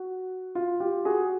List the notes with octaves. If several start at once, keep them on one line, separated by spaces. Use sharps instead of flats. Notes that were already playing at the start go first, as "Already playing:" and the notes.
Already playing: F#4
F4
F4 G4
F#4 G#4